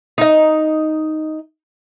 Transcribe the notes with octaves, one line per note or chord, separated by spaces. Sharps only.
D#4 D#5